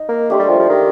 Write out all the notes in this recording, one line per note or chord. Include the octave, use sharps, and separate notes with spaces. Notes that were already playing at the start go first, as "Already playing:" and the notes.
Already playing: D#4 D#5
A#3
A3 D4 G4 C5
G3
F3
F3
D#3